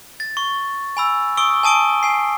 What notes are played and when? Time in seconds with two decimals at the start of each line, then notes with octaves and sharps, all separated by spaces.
0.20 A6
0.37 C#6
0.97 G#5 B5 E6
1.37 C#6 D#6 E6 D7 G7
1.63 G#5 A5 D#6 D7 G7
2.03 G#5 C7